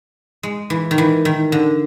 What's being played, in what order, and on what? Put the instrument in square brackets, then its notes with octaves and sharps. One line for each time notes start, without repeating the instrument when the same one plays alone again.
[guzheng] G#3
E3
D#3
E3
D#3
D3